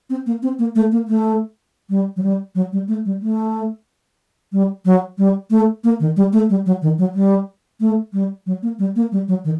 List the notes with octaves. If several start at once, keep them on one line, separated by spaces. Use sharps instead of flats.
C4
A#3
C4
A#3
A3
A#3
A3
G3
F#3
G3
F#3
G3
A3
G3
A3
G3
F#3
G3
A3
A#3
D#3
G3
A3
G3
F#3
D#3
F#3
G3
A3
G3
F#3
A#3
G3
A#3
G3
F#3
D#3